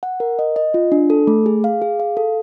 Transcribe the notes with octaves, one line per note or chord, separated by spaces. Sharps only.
F#5
A#4
D#5
D#5
F4
D4
A4
A3
G#4
F5
G#4
F5
A4